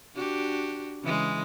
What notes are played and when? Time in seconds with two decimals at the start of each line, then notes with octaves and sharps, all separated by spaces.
0.16 D4 F#4 G4
1.03 C#3 E3 G#3